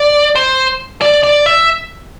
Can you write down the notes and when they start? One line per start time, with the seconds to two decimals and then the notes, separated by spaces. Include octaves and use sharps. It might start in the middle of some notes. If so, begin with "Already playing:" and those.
Already playing: D5
0.35 C5
1.01 D5
1.23 D5
1.46 E5